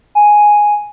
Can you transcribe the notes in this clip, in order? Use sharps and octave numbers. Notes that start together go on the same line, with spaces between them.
G#5